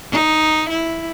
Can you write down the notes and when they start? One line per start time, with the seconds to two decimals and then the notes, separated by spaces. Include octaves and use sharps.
0.11 D#4
0.69 E4